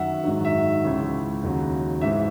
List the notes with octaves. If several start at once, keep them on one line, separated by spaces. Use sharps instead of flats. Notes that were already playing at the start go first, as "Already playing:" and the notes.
Already playing: F#2 D#3 F#3 E5 F#5
G#2 D#3 F#3
E5
C#2 C#3 E3
D#2 C#3 F#3
G#2 E3 E5